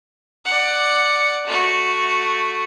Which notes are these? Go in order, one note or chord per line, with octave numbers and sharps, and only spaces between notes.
D5 F#5
A3 F#4